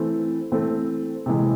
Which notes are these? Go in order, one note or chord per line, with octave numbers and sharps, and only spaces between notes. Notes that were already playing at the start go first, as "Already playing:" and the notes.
Already playing: E3 A3 C4
E3 A3 C4
C3 E3 G#3